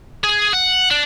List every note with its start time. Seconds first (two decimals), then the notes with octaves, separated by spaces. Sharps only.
0.24 G#4
0.53 F#5
0.91 D4